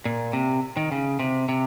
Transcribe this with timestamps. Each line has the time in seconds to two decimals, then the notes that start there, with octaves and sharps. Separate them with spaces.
0.05 A#2
0.33 C3
0.77 D#3
0.92 C#3
1.19 C3
1.49 C3